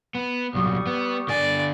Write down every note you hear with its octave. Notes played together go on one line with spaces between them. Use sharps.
B3
C2 F#3 G3 C#6 D#6
B3
D3 D5 G#5